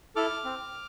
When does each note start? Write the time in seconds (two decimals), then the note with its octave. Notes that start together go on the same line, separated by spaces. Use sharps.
0.16 E4 A4 D6 F6
0.45 C4